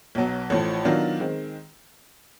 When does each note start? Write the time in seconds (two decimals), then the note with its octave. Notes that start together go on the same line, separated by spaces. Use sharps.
0.15 B1 B2 F#3 B3
0.50 A1 A2 F3
0.85 D#3 F#3 B3 D4 F4
1.20 D#3 G#3 C4